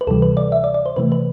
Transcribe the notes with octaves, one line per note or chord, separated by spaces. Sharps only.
B4
D2 C3 E3 G3 A4
B4
D5
E5
D5
D5
C5
C3 E3 A3 B4
B4